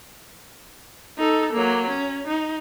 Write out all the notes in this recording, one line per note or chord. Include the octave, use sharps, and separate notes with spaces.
D#4 A4
F#3 A#3
C#4
D#4